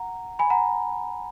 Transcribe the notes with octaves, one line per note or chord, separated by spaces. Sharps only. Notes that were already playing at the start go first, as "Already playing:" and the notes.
Already playing: F#5 A#5
G#5 B5
F#5 A#5